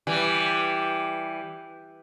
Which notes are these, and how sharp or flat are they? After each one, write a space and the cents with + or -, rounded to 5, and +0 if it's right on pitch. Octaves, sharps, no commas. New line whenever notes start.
E3 +0 G3 +0